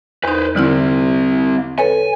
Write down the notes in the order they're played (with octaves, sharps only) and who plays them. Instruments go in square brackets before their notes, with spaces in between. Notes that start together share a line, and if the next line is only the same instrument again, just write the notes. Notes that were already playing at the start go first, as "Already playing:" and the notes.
[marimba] E2 D#4 [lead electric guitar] B4 C5
[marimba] D3 E4 F6 [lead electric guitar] G3 C4
[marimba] A4 B4 C#5 [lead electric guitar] G#5